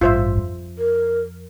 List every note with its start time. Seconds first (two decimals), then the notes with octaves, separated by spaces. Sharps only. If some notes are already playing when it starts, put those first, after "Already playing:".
0.01 A1 G2 F4 C5 E5
0.37 F2
0.79 A#4